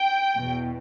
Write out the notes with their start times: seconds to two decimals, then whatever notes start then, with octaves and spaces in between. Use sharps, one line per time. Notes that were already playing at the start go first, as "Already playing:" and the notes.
Already playing: G5
0.36 E2 B2